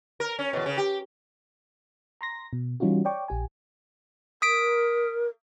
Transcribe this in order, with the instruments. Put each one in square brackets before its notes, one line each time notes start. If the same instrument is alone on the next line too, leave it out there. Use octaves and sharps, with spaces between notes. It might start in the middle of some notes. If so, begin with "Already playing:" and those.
[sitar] A#4
C#4
E2 B2
C#3
G4
[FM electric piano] A#5 C6 A#6
B2
E3 G3 C#4 D#4 F4 F#4
C#5 D5 G5 C#6 D6
A#1 G4 G#5
[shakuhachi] A#4 [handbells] D#6 B6 D7